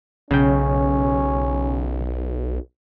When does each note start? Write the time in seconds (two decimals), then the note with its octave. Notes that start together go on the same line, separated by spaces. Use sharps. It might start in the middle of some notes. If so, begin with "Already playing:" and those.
0.31 B1 C#3 C#4 G5